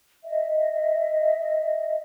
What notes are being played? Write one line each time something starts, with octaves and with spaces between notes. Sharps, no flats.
D#5 E5